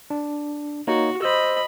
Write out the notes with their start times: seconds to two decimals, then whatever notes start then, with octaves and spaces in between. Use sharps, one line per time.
0.10 D4
0.87 A#3 D#4 F#4 C#5
1.22 C5 D#5 B5 E6